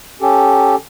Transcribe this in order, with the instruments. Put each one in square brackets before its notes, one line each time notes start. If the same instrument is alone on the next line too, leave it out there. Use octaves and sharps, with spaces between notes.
[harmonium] C#4 G4 A4